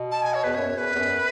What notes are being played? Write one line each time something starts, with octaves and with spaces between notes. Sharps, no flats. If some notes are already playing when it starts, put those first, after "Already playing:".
Already playing: B2
A5
G#5
C#5
E2 B4
F#2 C#5
E2 B4
E2
F#2